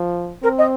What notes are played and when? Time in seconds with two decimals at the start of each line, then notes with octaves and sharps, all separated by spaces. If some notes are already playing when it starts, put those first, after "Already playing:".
Already playing: F3
0.43 C4 A#4
0.58 D#5